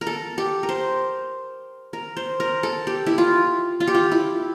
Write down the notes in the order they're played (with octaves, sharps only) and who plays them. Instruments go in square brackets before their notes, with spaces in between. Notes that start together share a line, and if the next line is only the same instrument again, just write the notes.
[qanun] A#4
A4
G4
A#4
C5
A#4
C5
A#4
A4
G4
E4
F4
F4
G4
F4
E4